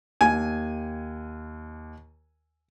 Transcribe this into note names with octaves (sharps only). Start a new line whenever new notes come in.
D#2 G#5